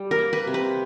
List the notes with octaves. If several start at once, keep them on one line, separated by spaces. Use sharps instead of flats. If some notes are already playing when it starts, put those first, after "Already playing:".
Already playing: G3
A#4
A#3
B4
C3
B4